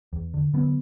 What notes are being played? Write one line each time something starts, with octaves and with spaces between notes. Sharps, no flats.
E2
D3
D3 F#3 B3